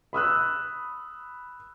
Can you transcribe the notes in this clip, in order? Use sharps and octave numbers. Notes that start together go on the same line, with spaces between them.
B5 D#6 E6 F#6